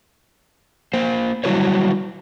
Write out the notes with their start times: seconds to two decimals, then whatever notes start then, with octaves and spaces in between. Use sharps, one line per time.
0.93 A#3 C5
1.44 F#3 G3 E4 F#4 B4 C#5